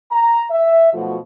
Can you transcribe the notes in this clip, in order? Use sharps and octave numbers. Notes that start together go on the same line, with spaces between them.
A#5
E5
B1 B2 F3 A3 F#4